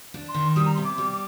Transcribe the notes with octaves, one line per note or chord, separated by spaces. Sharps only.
D4
C6
D#3
G3 D#6
A#5
C3 C6
D6
G3
D6